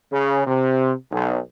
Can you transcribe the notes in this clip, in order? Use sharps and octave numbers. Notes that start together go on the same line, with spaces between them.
C#3
C3
B1